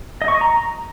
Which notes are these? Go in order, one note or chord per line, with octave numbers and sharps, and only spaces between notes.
D#5
C#6
D#5
A#5